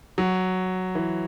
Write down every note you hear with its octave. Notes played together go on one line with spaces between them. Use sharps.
F#3
E3